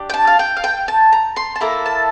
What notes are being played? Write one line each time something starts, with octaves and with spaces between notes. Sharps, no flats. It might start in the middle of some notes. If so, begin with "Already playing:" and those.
Already playing: D4 G4
G5
A5
F5
G5
F5
G5
A5
A#5
C6
A5
A#3 E4 A4 A#5
A5